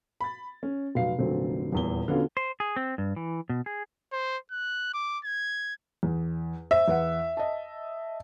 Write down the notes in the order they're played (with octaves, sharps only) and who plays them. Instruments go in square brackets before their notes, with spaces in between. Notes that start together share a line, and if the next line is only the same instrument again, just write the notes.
[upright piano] B5 A6
C#4
F1 F#3 F5 C7
F1 A#2 D3 F#3 C4
D#1 E2 G7
D3 B3 C#4 F4 F#4
[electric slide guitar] C5
G#4
C4
G2
E3
B2
G#4
[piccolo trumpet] C5
F#6
D6
G#6
[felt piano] E2
[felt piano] C5 [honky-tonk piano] E5
[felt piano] E2 B4 F#5
D#5 A5